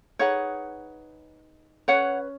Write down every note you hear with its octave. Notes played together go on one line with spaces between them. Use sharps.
D#4 G#4 B4 C#5 F#5
C#4 B4 C#5 F#5